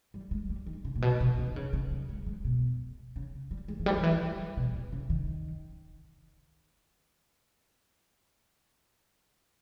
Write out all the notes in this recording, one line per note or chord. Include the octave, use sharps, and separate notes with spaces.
G3
G#3
G3
D#3
C#3
A#2
B2
B2
C#3
D#3
C#3
C#3
G3
G#3
G#3
B2
C#3
G3
G#3
E3
G3
D#3
E3
G3
G3
B2
B2
C#3
D#3